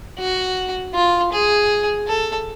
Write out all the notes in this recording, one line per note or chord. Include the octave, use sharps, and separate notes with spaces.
F#4
F4
G#4
A4